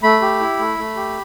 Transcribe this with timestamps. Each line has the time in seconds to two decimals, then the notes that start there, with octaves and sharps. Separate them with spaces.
0.03 A3 B5
0.22 G4
0.40 E4
0.59 A3
0.78 A3
0.96 G4